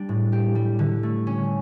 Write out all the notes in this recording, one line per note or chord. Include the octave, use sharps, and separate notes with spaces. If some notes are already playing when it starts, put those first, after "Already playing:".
Already playing: G3 D4
A2
G4
G3
D3
A3
C#4